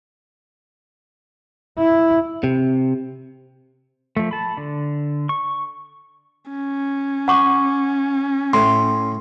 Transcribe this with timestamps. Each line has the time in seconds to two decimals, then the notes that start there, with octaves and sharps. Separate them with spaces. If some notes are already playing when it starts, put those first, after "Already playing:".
1.79 E4
2.44 C3
4.17 F3 A3
4.31 A5 B5
4.57 D3
5.29 C#6
6.51 C#4
7.28 F#5 C#6 D6
8.53 A2 C6